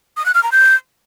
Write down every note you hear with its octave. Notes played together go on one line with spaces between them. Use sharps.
D#6
F#6
F6
A#5
G6